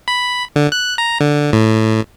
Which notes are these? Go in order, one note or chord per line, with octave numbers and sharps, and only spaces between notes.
B5
D3
F#6
A#5
D3
A2